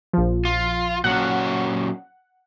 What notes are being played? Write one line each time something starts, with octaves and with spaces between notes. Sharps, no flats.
A#1 F3
F4
A#2 F#3 C#4 F#5